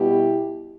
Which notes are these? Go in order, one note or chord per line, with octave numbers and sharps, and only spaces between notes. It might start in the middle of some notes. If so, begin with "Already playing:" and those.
Already playing: B2 G3 B3 E4 G4